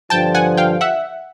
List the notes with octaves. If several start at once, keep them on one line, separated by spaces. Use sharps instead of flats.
G2 D3 F3 G5 A5
F#5 G#5
F5 G5
E5 F#5